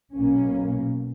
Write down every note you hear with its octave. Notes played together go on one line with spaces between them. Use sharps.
B1 B2 A#3 C#4